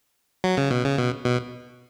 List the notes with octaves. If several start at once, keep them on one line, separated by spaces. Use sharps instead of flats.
F#3
C#3
B2
C#3
B2
B2